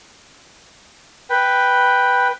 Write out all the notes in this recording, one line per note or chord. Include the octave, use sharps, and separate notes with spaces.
B4 G5